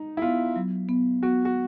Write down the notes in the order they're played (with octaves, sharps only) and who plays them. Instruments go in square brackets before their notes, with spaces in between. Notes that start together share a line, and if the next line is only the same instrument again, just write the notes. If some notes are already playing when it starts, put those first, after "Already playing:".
Already playing: [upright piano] D#4
E4
[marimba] B3 [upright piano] F4
[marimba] F#3
B3
[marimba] B3 [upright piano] F#4
[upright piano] F#4